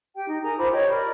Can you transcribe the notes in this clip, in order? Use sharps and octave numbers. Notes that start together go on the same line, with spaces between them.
G4 G5
D#4
G#4 A#4 A#5
F4 C5 B5 D6
G4 C#5 D#5
A#4 D5 B5